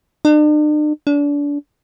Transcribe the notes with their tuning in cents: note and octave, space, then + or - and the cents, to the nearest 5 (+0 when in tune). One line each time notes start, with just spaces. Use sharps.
D4 +45
D4 -30